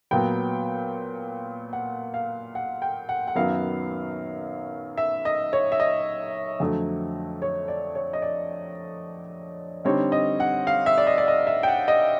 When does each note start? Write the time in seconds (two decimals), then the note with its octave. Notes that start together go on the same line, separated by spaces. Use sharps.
0.11 A#2 F#3 B3 G5
1.73 F#5
2.14 F5
2.55 F#5
2.82 G5
3.09 F#5
3.28 F#5
3.35 F#2 D#3 F#3 B3 F5
4.98 E5
5.25 D#5
5.53 C#5
5.72 E5
5.80 D#5
6.60 F2 D3 F#3 A3
7.42 C#5
7.68 D5
7.95 C#5
8.13 D#5
8.22 D5
9.85 D3 G3 C4 D#4 C#5
10.12 D#5
10.40 F#5
10.67 F5
10.86 E5
10.98 D5
11.07 D#5
11.18 D5
11.28 D#5
11.47 E5
11.63 G5
11.68 F#5
11.88 D#5